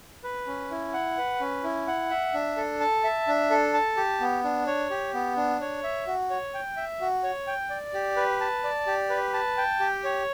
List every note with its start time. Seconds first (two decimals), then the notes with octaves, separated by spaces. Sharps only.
0.24 B4
0.47 C#4
0.71 E4
0.93 F#5
1.17 B4
1.40 C#4
1.64 E4
1.87 F#5
2.10 E5
2.34 D4
2.57 A4
2.80 A5
3.04 E5
3.28 D4
3.50 A4
3.74 A5
3.97 G4
4.20 B3
4.44 D4
4.67 C#5
4.90 G4
5.14 B3
5.37 D4
5.61 C#5
5.84 E5
6.07 F#4
6.30 C#5
6.54 G5
6.77 E5
7.01 F#4
7.24 C#5
7.47 G5
7.70 D5
7.94 G4
8.17 B4
8.41 A5
8.64 D5
8.87 G4
9.10 B4
9.34 A5
9.57 G5
9.80 G4
10.04 C#5